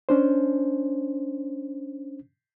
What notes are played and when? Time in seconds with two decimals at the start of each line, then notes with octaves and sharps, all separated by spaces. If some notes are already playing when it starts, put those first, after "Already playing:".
0.09 C#4 D4 C5